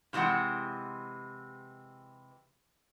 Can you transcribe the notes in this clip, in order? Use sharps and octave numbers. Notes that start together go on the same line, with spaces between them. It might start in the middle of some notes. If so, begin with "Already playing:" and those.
G2 C3 E3 G#3 F#5